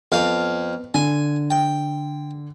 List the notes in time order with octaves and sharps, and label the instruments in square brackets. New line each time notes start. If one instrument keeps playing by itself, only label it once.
[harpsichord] F2 F5 [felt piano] B3
[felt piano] D3 [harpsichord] G#5
[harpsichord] G5